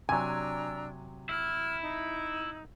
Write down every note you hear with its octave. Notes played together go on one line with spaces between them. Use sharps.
C3 F#3 D4 G#5 A#5 E6
E4 F6
D#4